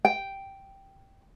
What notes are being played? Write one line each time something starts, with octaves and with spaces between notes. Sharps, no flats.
G5